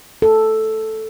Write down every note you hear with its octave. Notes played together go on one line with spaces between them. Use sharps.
A4